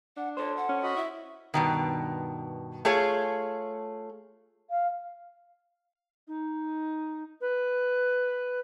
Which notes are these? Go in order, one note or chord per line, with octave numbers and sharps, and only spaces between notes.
D4 F#5
A4 C5 C#5
F#5
C#4
F#4 D#5 B5
E4 E5
G2 B2 D#3
A3 F4 G#4 C#5
F5
D#4
B4